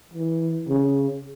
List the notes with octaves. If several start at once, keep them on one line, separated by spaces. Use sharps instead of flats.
E3
C#3